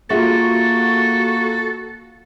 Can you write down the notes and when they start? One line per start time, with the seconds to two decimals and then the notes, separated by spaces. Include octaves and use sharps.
0.10 A#3 F4 F#4 G#4 A4 E5